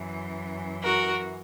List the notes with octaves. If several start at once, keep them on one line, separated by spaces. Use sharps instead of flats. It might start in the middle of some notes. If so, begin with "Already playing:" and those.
Already playing: F#2 E3
F#4 A#4